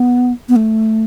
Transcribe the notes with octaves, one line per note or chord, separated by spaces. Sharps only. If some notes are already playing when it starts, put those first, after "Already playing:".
Already playing: B3
B3
A3